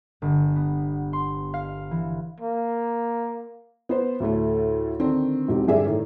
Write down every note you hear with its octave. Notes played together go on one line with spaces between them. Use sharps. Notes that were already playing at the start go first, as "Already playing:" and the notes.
G1
B3
C6
F5
E3
A#3
B3 C5
D2 A2 A3
D3 D#3 C4 D4
E1 C4 D#4 G4
G2 D3 G#4 D5 E5
A2 D#3